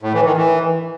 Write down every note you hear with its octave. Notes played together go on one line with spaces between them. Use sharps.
A2
E3
D#3
E3